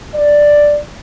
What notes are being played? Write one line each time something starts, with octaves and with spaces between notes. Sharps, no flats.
D5